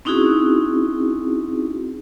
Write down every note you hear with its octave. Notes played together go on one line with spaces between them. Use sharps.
C4 C#4 D#4 E4 F#4 G#4